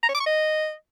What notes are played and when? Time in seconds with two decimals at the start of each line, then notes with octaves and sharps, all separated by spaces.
0.03 A#5
0.09 C#5
0.15 D6
0.21 C#6
0.26 D#5